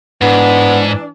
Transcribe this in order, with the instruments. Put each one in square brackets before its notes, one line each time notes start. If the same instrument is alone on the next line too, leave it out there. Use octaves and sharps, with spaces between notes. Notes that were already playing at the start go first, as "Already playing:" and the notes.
[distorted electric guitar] G#2 [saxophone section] E3 D4 [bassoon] B3